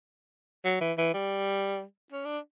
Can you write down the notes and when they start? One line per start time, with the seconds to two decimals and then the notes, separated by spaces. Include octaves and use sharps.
0.65 F#3
0.81 E3
0.98 E3
1.14 G3
2.12 C#4
2.25 D4